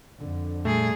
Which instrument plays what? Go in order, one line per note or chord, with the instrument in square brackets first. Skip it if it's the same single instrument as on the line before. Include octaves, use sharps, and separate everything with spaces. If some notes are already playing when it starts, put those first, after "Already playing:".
[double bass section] F2 D3
[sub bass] A#2 [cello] G3 G#4 [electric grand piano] A3